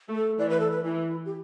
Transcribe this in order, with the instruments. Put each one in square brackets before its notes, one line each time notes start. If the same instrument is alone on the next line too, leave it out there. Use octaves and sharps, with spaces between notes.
[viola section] A3
[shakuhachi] A4
[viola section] E3 [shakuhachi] D5
[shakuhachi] B4
A4
B4
[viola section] E3 [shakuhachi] E4
[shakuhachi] G4